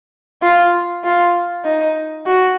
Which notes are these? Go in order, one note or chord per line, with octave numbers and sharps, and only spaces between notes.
F4
F4
D#4
F#4